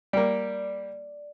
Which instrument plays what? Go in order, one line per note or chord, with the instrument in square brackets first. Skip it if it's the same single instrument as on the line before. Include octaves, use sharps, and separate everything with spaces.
[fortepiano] G3 A#3 [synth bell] D5